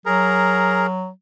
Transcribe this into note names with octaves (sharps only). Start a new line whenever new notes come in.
F#3 G#4 A#4 A#5